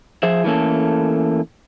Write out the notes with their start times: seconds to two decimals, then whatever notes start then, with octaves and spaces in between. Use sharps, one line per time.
0.23 F3 G#4 C5 E5
0.44 E3 A3 A#3 C#4 A4